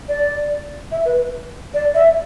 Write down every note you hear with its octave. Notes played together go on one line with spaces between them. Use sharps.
D5
E5
B4
D5
E5